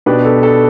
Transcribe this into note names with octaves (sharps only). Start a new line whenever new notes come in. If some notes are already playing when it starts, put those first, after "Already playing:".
B2 B3 D4 G4 B4
A4
A4